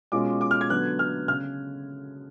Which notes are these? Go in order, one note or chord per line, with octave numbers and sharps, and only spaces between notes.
B2 G#3 C#4 F4 D6
D6
F6
G#6
D3 F#3 B3 F#6
F6
C#3 F6